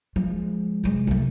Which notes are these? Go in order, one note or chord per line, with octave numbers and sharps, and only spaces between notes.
F3 G#3
F1 G#3
C2 A3